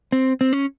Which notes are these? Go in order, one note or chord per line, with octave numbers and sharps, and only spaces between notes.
C4
C4
C#4